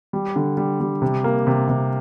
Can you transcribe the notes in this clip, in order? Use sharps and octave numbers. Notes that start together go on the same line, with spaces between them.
G3
D3
G3
G3
C3
A#3
C3
C3